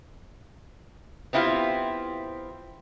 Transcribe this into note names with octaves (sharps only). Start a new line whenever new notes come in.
B3 C4 E4 F4 G4